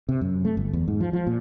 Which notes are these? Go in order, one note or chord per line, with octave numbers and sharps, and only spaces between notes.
C3
F#2
A3
G1
E2
G#2
F3
F3
A#2